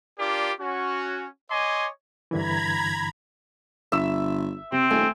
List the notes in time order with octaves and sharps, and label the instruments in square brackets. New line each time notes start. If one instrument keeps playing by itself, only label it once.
[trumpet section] D4 F4 G4 A#4 D5
C#4 F#4
C#5 D#5 G#5 C6 D6
[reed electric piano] G2 D3 E3 [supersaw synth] A#5 B5 G#6
[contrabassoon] G1 [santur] E5 E6
[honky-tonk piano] C3 [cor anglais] C4
[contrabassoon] D#1 [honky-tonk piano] A3 [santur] G#5